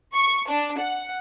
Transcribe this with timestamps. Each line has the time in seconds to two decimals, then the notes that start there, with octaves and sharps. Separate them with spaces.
0.14 C#6
0.49 D4
0.79 F#5